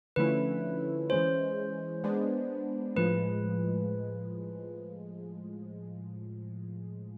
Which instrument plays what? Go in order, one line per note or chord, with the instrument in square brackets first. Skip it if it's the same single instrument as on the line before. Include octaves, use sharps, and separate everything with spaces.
[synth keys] D3 F3 A3 C#4 E4 [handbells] B4
[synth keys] E3 G#3 C#4 [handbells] C5
[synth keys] G#3 B3 D4
[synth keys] A2 F3 G#3 [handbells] B4